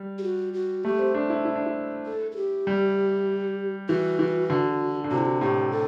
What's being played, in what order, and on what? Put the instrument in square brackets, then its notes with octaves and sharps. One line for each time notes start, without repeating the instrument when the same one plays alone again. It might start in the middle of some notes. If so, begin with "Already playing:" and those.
Already playing: [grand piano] G3
[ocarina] G4
F#4
F#4
[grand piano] A3 [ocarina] G4
[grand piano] C4
D4
E4
E4
D4
E4
[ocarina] A4
A4
G4
[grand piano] G3
[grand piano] E3 [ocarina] F#4
[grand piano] E3
D3
D3
[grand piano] C3 [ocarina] F#4
[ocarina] E4
F#4
[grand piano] A2 [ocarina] G4
[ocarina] A4